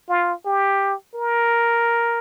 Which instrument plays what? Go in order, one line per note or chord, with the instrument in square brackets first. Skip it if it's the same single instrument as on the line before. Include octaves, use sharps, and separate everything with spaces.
[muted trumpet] F4
G4
A#4